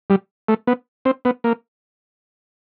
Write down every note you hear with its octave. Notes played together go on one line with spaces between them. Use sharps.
G3
A3
B3
C4
B3
A#3